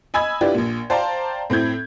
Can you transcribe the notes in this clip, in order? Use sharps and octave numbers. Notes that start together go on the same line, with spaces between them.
D#5 G#5 B5 E6 G#6
D4 E4 F4 G4 B4 D5
A#1 A#2
C5 D5 F5 G5 A5 A#5
A2 C4 E4 G6 G#6